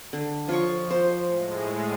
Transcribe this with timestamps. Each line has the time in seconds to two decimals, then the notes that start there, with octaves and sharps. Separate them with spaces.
0.13 D3
0.49 F3 F4 C#5 C#6
0.90 C5
1.26 A2 G#3